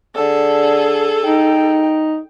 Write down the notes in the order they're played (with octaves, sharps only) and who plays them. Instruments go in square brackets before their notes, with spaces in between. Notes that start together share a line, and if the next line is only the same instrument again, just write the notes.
[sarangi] D3 [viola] G#4 A4
[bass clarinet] D#4 [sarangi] G5